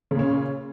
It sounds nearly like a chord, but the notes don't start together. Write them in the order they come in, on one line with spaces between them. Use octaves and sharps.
C#3 A#2 C#4